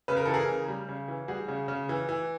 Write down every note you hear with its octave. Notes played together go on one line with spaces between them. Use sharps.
C#3 B4
A#4
E3 A4
G#4 A#4
C#3
G3
C#3
E3
G3 F#4 G#4
C#3
C#3
E3
E3